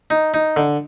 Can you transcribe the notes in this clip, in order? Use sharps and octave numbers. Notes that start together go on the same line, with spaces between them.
D#4
D#4
D3